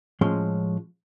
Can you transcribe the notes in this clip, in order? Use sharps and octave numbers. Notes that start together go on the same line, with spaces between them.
A2 F3 G#3 C#4 C6